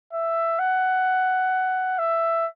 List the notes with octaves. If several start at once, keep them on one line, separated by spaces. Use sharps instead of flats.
E5
F#5
E5